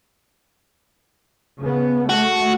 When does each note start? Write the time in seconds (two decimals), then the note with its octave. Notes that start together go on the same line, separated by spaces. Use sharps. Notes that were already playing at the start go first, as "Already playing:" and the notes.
1.61 C#3 B3
2.10 A3 F#4